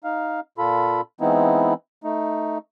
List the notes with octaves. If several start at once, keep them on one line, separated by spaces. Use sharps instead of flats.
D#4 F5
A#2 F4 A4 B5
E3 G#3 B3 C4 D#4 E4
A3 D#4